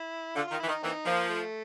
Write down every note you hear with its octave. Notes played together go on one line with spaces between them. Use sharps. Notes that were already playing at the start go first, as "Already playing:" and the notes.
Already playing: E4
D3 F4
D#3 F4
E3 E4
D#3
D#4
E3 A#3 C4 D#4
F3 A#3
A3